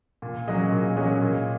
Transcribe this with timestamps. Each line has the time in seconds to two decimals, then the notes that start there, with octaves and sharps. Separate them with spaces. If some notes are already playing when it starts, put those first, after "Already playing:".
0.22 A#2
0.48 F#3 C#4 G#4 D#5
0.72 A#2
0.96 F#3 C#4 G#4 D#5
1.22 A#2